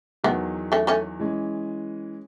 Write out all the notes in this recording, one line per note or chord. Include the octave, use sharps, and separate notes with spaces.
E2 D#3 F#3 B3
A3 C#4
A3 C#4
E3 G#3 C#4